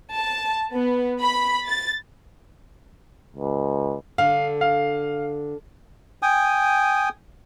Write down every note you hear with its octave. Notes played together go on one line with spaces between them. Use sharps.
A5
B3
B5
A6
C#2
D3 F5
F5
G5 G#5 D#6